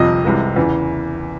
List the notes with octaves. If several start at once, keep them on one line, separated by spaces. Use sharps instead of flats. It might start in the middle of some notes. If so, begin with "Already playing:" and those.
Already playing: G1 F2 C3 F3 D#5
C2 C3 E3 G#3
E2 C#3 E3